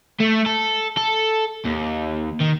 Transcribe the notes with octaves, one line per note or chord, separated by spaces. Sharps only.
A3
A4
A4
D#2
D#3